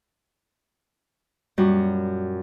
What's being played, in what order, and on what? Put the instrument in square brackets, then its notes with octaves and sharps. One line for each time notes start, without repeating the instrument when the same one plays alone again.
[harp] F#2 A#2 G3 F#4